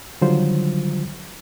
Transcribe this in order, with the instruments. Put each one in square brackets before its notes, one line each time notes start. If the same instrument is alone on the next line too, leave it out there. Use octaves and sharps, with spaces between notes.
[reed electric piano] D3 D#3 F#3 G3 F4 C5